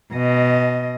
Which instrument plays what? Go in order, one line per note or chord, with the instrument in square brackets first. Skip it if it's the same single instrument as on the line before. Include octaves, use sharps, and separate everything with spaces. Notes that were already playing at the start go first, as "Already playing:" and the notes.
[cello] B2 D#5